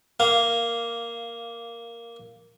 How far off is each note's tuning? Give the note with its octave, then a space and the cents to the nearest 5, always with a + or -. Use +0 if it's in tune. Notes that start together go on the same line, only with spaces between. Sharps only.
A#3 +0 F5 -10